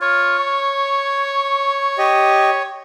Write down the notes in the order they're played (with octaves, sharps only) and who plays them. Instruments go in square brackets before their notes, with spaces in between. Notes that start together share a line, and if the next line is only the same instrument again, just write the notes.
[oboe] F4 [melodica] C#5
[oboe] C#6
[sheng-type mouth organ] G4 D#5